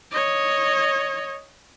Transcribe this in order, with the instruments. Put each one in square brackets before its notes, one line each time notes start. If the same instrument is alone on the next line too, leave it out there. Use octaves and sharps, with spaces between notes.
[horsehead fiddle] C#5 D#5